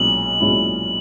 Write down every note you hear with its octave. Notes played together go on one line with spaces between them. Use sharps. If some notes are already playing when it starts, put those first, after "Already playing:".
Already playing: B1 A#2 G#3 C#4 E4 F#7
B1 A#2 G#3 C#4 E4